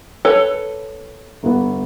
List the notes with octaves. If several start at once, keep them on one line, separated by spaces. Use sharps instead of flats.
A4 B4 C#5
G1 B3